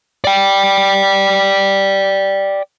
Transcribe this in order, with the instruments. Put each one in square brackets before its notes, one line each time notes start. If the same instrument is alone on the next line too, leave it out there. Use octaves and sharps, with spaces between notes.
[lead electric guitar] D5 G5